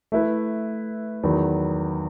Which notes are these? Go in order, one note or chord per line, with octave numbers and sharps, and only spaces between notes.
A3 E4 B4
E2 D#3 F#3 B3